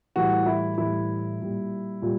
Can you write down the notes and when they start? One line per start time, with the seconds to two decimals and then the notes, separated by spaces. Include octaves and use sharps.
0.16 A2 E3 G3 F#4
0.46 E4
0.78 A2 E3 G3 E4
1.40 A#2 G3 A#3
2.02 A#2 G3